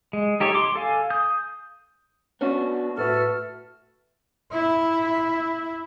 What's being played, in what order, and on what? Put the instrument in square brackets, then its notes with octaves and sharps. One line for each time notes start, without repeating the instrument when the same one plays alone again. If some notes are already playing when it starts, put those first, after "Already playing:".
[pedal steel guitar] G#3
D#4 G4 A4 C#5
C6 D6
A4 F5 G#5
D#6 G6
[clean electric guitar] B3 D4 F#4 [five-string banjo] C#4
[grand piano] A2 B4 [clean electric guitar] F#4 [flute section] A4 E5 F6
[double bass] E4